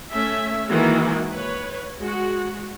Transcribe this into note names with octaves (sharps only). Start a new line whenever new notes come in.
A3 C#4 E5
D#3 E3 G#3 A#3 F#4
B4 C#5
G#3 F#4